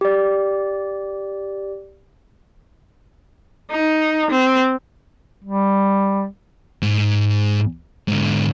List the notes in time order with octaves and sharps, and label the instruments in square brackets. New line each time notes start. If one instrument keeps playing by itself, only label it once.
[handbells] G4 D5
[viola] D#4
C4
[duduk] G3
[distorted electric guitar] G#2
G#2 D3